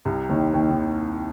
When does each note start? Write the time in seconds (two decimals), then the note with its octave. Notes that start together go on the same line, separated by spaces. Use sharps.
0.05 C2 C3
0.29 D#2 D#3
0.54 D#2 D#3
0.70 D#3